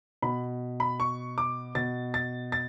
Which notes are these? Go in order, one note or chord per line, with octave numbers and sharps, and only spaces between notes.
B2 B5
B5
C#6
D6
B2 A6
A6
A6